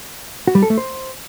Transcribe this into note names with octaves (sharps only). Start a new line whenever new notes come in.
F#4
G3
A4
A3
C5